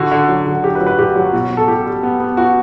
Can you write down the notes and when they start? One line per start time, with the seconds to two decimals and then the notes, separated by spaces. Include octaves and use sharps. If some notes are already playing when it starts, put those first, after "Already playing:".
Already playing: D3 F#4
0.11 D3
0.29 F#3
0.47 D3
0.63 F#3 G4
0.75 B4
0.81 F#3
0.87 B4
0.99 G2 G4
1.16 F#3
1.33 B2 F#4
1.50 B2
1.57 A4
1.68 G3 G4
1.86 G3
2.03 B3
2.20 B3
2.37 B3 F#4